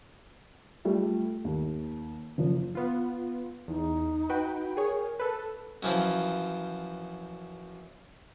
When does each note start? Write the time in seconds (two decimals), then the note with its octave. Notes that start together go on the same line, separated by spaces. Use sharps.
0.85 G3 A3 F4
1.45 D#2
2.38 F#1 F3
2.75 B3 F4
3.68 E2 D#4
4.30 F#4 B4 G5
4.77 G#4 A#4 C#5
5.20 A4 B4
5.83 F#2 E3 F3